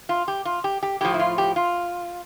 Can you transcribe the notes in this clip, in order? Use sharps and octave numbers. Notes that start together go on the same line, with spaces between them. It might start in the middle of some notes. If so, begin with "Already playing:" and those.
F4
G4
F4
G4
G4
A2 F3 G4
E4
F4
G4
F4